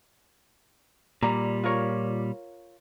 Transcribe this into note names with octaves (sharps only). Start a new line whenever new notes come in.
A#2 G3 A#5
F4 A#4 C#5